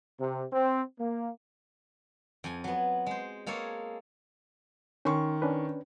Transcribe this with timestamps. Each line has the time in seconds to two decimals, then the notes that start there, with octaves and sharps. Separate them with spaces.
0.19 C3
0.53 C4
0.99 A#3
2.44 F2 G#5
2.64 F#3 B3
3.06 G#3 C5
3.46 G#3 A#3 G#4 A4 C#5
5.05 D#3 C#4 C6 C#6
5.42 C#4 D4 B4